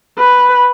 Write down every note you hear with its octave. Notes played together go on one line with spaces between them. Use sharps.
B4